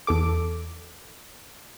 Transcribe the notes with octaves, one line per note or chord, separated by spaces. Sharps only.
E2 A4 D6